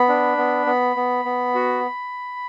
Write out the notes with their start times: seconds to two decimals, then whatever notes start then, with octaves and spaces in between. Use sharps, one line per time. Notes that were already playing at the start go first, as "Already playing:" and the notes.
Already playing: B3 B5
0.09 D4
0.37 B3
0.66 B3
0.96 B3
1.25 B3
1.55 F#4